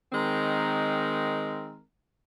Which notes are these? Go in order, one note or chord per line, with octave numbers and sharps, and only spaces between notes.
D#3 G#3 C4 A#4